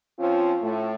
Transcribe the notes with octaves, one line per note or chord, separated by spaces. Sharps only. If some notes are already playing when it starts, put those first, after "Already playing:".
F3 C4 C#4 F4
A2 A3